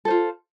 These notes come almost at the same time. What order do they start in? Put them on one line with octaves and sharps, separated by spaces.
A4 C5 F4